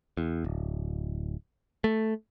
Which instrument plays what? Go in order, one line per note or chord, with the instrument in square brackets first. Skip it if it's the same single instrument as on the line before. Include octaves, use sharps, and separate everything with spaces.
[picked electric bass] E2
D1
A3